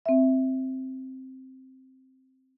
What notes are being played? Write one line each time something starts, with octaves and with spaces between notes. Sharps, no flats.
C4 E5